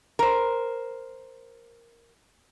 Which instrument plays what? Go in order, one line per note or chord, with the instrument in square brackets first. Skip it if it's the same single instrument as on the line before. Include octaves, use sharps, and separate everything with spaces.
[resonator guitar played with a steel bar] A#4 C5